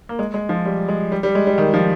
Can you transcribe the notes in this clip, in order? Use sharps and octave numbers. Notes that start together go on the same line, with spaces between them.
A#3
G#3
G#3
F3
G3
G#3
G3
G3
G#3
G3
D#3
F3